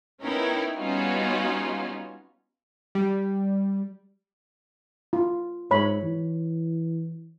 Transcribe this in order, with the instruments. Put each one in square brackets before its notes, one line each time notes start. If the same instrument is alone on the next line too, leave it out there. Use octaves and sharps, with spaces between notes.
[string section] B3 C#4 D#4 E4 A#4 G5
G3 B3 C#4 D#4 F4 F#4
[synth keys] G3
[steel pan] F4
[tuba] G#2 [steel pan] C#5 B5
[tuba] E3